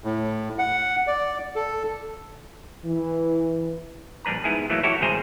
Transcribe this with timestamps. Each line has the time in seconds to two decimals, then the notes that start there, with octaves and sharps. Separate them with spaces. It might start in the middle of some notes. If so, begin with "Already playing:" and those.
0.04 A2
0.59 F#5
1.07 D5
1.56 A4
2.86 E3
4.25 A#1 G3 D4 B4 A#5
4.44 G#2 B3 E4 G#4
4.70 E3 F#3 A3 A#3 E4
4.83 E4 F#4 G4 A4 C#5
5.01 G#1 B2 G3 G#4 C5 A#5